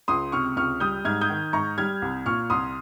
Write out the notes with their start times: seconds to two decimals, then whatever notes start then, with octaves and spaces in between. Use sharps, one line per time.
0.08 C#2 C6 D#6
0.32 C3 C#6 F6
0.56 C#2 C#6 F6
0.80 G3 D#6 G6
1.05 G#2 F6 G#6
1.21 D#6 G6
1.30 D#3
1.53 G#2 A#5 C#6
1.78 G3 F6 G#6
2.02 C2
2.26 A#2 C#6 F6
2.50 C2 C6 D#6